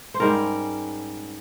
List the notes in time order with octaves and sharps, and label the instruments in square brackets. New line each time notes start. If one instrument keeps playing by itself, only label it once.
[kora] C5
G#2 G3 C#4 A#4